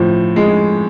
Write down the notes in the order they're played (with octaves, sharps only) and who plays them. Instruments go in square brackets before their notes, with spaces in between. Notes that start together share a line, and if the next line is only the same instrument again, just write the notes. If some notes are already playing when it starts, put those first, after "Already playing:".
Already playing: [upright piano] A2 F3
G#3